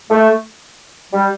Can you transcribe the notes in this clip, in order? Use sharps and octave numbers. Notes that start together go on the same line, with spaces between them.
A3
G3